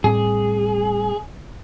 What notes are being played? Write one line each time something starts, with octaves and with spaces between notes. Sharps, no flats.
A2 G3 C4 G#4